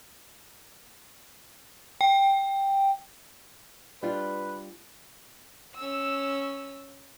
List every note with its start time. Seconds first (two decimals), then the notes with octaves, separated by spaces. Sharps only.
2.01 G5
4.03 G3 D4 F4 B4
5.76 C#4 E6